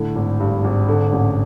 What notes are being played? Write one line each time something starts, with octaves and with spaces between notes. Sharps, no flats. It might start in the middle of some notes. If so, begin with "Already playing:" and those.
Already playing: A2 D3
G#1
G2
G#1
D3
A1